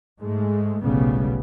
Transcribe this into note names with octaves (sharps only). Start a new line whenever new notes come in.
G#2 G#3 A3
F1 B1 A2 C#3 G3 B3